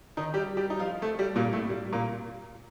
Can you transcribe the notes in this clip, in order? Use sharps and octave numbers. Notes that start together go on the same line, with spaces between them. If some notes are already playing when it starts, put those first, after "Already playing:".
D#3 D#4
G3 G4
G3 G4
D#4
F3 F4
A3 A4
G3 G4
A#2 A#3
A2 A3
G3
A#2 A#3